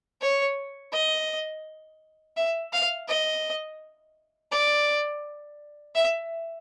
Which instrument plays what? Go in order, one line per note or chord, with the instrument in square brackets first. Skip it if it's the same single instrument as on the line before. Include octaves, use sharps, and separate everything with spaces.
[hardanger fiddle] C#5
D#5
E5
F5
D#5
D5
E5